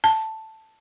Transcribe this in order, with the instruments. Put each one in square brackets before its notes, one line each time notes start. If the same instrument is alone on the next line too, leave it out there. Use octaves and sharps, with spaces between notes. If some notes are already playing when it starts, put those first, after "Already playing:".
[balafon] A5